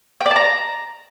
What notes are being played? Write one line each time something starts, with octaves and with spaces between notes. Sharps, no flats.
G5
D5
A5
A#5